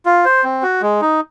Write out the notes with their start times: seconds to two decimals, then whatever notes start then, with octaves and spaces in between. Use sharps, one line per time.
0.06 F4
0.25 C5
0.44 C4
0.63 F#4
0.82 G#3
1.01 D#4